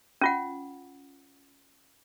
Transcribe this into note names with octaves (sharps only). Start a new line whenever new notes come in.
C#4 F4 F#5